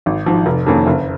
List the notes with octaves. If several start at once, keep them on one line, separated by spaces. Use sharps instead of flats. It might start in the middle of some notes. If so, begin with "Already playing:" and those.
G#1
G#2 F3
F1
F2 D#3 A#3 C#4
F#1